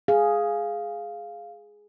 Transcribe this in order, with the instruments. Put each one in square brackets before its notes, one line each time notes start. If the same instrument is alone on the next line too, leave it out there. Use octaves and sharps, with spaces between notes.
[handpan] G#4 [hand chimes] F5